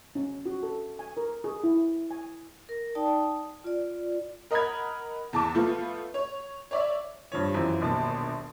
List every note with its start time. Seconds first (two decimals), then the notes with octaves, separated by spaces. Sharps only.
0.15 C#4
0.46 F#4
0.63 A4
0.99 G#5
1.17 A#4
1.44 G#4
1.63 E4
2.11 G#5
2.69 A#4
2.95 D#4 D5 G5 A5 D#6
3.64 F4 D5
4.51 A#4 D#5 F#5 B5 F6 G#6
5.33 E2 A5 D6
5.55 F3 A3 B3 F4
6.14 C#5
6.71 C#5 D5 E5
7.32 G2 F3 C#5
7.54 F#2 E3 C4 F4
7.80 D#1 A#1 B2 A5